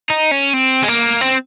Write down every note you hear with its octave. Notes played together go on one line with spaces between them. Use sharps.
D#4
C#4
C4
G#3
A#3
C4